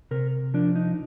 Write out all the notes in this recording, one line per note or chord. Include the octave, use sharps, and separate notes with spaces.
C3 A#4
F3 D4
D#4